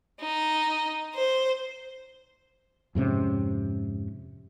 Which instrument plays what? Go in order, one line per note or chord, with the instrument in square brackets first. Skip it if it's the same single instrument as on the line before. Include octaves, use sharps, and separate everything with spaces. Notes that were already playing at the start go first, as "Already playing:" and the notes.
[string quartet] D#4
C5
[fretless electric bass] F2 G#2 C3 C#4